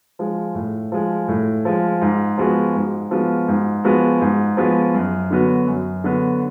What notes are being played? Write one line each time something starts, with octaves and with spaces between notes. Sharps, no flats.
F3 G#3
A2
F3 G#3
A2
F3 G#3
G#2
F3 G#3 B3 F#4
G#2
F3 G#3 B3 F#4
G#2
F3 G#3 B3 F#4
G#2
F3 G#3 B3 F#4
F#2
D3 F#3 B3 F#4
F#2
D3 F#3 B3 F#4